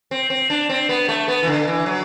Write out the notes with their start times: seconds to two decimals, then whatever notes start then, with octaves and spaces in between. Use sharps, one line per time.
0.11 C4
0.30 C4
0.50 D4
0.69 C4
0.89 B3
1.08 A3
1.28 B3
1.43 E3
1.47 D3
1.67 E3
1.86 F#3